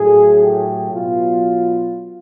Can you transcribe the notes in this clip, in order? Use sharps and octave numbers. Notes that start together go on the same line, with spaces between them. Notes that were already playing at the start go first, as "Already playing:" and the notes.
Already playing: A2 F#3 A3 G#4
G4
B2 F#3 B3 F4